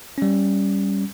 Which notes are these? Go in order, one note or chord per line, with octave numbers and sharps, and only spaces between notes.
G3 C#4